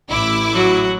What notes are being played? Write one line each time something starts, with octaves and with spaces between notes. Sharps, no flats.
A1 E4 D6
F#3 F#4